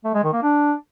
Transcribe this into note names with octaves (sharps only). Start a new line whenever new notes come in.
A3
G#3
D#3
A#3
D4